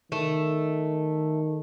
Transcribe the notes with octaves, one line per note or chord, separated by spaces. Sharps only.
D#3 A3